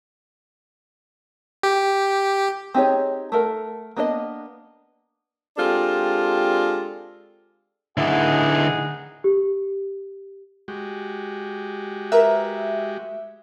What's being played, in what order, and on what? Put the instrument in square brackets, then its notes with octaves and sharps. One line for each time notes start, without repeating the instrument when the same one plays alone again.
[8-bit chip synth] G4
[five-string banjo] C4 D#4 G4 G#4 C#5
A3 A4 A#4 F#5
A#3 B3 D4 C5 D#5
[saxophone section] G#3 C4 D4 F4 G4 A4
[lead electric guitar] D3 E4 [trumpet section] D#4 G#4 F#5
[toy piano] G4
[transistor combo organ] G#3 F#4 G4
[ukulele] A#4 B4 A#5 [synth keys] E5